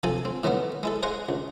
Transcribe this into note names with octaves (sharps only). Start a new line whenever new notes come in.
C3 F3 A4 G#5
C4
A2 D#3 G3 A3 B3
G#3 E4 A4
G#4 C5 D#5 F5 F#5
C#2